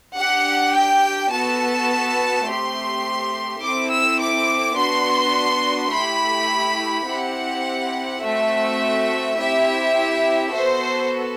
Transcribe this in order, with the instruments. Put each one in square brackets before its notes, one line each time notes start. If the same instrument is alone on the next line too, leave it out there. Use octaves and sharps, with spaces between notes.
[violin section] D4 G4 F#5
G5
B3 F#4 A4 A5
A3 C4 G4 C6
C4 E4 A4 D6
E6
D6
B3 D4 F#4 C6
A3 E4 G4 B5
C4 E4 G4 F#5
A3 C4 F#4 A4 E5
C4 E4 G4 E5
B3 F#4 A4 C5